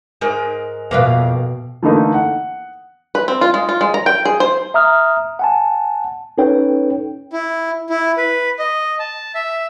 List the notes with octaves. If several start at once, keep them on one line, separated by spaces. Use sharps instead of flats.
G#2 G#3 A#4
F2 B2 A#3 B4 F5
D3 E3 A3 A#3 D4 D#4
F#5
B4
C4
F4
G#3
F4
G#3
A#5
G5
G#4
C5
E5 A#5 D#6 F6
F#5 G#5 A5
C#4 D#4 A4 B4 C#5 G5
E4
E4
B4
D#5
A5
E5